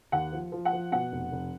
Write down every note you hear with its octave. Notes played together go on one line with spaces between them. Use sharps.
D#2 F#5
F3
F3
F#5
F3
B2 F#5
F1
F1